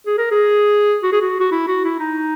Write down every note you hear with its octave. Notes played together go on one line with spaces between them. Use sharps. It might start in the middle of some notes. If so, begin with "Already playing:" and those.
G#4
A#4
G#4
F#4
G#4
F#4
F#4
E4
F#4
E4
D#4